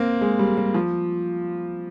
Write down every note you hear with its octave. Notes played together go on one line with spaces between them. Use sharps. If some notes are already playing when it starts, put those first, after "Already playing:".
Already playing: A#3 C4
G#3
G3
G3
F3